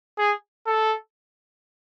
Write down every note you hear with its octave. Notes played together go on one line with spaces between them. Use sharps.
G#4
A4